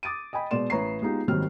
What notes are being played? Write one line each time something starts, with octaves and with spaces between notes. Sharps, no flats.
D6 D#6 A6 D7 D#7
D#5 G5 G#5 B5
B2 G#3 B3 D5 C6 E7
A1 B4 C#5 A#5 C#6 C7
G#3 B3 D#4 F4 G4
G#1 D#3 F#3 G3 C4 F6